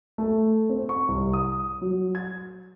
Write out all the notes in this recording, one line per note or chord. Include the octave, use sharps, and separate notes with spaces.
A3
C4
C#6
C2
D#6
F#3
G#6